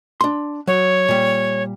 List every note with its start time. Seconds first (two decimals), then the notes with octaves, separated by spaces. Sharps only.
0.21 D4 C6
0.67 F#3 C#5
1.08 A#2 G3